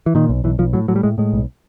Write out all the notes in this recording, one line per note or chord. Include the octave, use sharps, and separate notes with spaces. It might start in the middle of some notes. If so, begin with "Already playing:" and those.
E3
A#2 D#3
B1
B1 E3
B1 F3
A2 F#3
A2 F#3
G3
A2 G#3
A2 G#3
B1